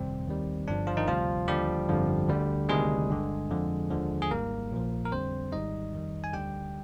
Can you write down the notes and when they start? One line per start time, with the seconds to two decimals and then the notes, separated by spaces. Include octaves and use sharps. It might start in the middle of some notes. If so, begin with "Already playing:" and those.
Already playing: G1 F2 C3 D#3 G3 C4
0.27 D#2 D#3 G3
0.67 G1 G2 F3 D4
0.87 F3 F4
0.97 D#3 D#4
1.07 D2 C3 F3 G3 F4
1.48 D#2 D3 F3 G3 G4
1.88 G1 F2 D3 F3
2.28 D2 D3 G3
2.69 D2 C3 D#3 G3 G#3 G#4
3.10 G1 G2 D3
3.50 F2 D3 F3
3.91 D#2 D3 F3
4.22 G#4
4.31 G#1 G#2 G3 A#3 A#4
4.71 A#1 A#2 F3
5.05 A#4
5.12 F2 D3 G3 C4 C5
5.52 G#1 G#2 D#3 G3 D#4 D#5
5.93 F2 D#3 G3
6.24 G#5
6.33 D2 D3 G3 G4 G5